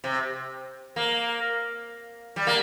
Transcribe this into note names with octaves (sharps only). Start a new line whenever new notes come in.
C3
A#3
G3
A#3